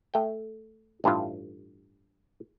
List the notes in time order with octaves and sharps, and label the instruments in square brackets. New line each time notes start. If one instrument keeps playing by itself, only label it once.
[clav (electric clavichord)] A3 G5
A1 G2 E4 F4